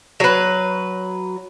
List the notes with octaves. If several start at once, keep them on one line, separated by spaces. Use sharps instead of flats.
F#3 B4